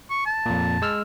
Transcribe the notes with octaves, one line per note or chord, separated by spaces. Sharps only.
C#6
A5
F2 A#2
G#3 E6 F6